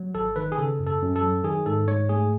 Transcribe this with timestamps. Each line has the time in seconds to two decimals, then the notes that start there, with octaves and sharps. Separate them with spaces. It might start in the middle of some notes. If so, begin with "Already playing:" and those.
Already playing: F#3
0.15 G#1 A4
0.36 D#3 B4
0.52 G#4
0.58 C#3 A4
0.79 F#2
0.87 A4
1.02 F#2
1.16 A4
1.23 F#3
1.44 D#3 G#4
1.66 G#2 A4
1.87 G#2 C#5
2.09 A3 G#4